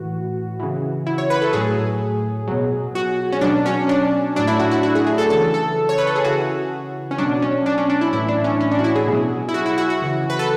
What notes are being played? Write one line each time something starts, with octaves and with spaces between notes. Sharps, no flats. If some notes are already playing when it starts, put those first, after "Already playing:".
Already playing: A2 E3 F#4
C#3 E3
E4
C#5
B4
A4
A2 F#3 G#4
B2 F#3
F#4
C#4
B2 F#3 D4
C#4
D4
A2 F#3 D4
E4
F#4
E4
F#4
G#4
G#4
A4
C#3 E3 A4
A4
C#5
B4
A4
G#4
C#3 E3 F#4
C#4
B2 F#3 D4
C#4
D4
C#4
D4
E4
A2 E3 E4
D4
C#4
C#4
D4
F#4
E4
G#4
B2
F#3
E4
F#4
E4
F#4
F#4
C#3 E3
B4
A4